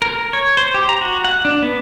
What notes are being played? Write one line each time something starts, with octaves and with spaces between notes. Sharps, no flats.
A#4
C#5
C5
G4
A#5
F#4
F#5
D4
B3